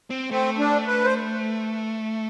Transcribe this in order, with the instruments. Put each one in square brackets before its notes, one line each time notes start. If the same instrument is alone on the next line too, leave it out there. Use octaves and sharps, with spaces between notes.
[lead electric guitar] C4
[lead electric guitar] A3 [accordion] C4
[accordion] D4
B4
C5